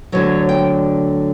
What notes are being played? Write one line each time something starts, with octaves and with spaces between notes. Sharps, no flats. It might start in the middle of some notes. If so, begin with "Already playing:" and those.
D2 D3 F#3 C#5
G5